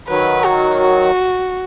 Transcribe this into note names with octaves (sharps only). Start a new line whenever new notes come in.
D#3 F#3 B4
F#4
F#4